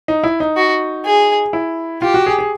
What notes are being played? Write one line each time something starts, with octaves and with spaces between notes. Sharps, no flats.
D#4
E4
D#4
F#4
G#4
E4
F4 G4
F#4
G#4
G#4